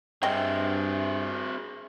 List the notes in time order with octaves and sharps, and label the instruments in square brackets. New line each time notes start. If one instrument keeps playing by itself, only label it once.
[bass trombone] G2 [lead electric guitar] C4 G#4 [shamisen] D#5 G5 [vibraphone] E5